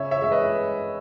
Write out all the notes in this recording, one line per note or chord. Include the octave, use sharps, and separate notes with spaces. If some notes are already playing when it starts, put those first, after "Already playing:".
Already playing: C#3 C#5 E5
C#5 E5
G#3 E5
B4 D#5